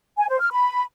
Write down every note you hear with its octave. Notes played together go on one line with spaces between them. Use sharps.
G#5
C5
F6
B5